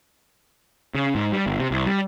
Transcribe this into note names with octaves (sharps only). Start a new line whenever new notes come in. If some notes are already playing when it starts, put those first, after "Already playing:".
C#3
G#2
G3
G1
C3
C2
G3